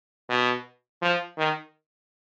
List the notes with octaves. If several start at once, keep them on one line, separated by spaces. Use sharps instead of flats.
B2
F3
D#3